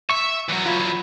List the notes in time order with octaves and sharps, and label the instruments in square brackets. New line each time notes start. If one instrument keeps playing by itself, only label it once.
[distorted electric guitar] E5 [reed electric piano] C#6
[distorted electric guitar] E2 F#3
[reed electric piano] F4 B5 G#6